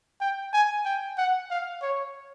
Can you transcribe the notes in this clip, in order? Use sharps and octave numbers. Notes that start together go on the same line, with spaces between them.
G5
G#5
G5
F#5
F5
C#5